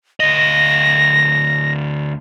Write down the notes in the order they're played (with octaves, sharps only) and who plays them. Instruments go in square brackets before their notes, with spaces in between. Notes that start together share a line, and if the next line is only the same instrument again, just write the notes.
[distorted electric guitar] D2 D#5 [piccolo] A#6